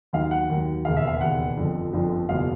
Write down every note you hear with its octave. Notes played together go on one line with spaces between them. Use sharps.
D#2 D#3 F#3 F5
F#5
D#2 D#3 F#3
E1 D#2 C#3 F5
E5
F5
E1 D#2 C#3 F#5
G1 F2 D3 F3
G1 F2 D3 F3
F#1 E2 B2 F#3 F5